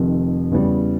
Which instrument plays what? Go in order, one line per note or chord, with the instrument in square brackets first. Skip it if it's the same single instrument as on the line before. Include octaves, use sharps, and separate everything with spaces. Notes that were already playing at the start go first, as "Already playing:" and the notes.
Already playing: [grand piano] F1 F2 C3 D#3
E2 C#3 E3 G3